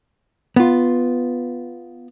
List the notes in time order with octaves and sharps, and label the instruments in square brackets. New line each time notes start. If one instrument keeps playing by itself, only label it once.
[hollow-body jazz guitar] B3 F4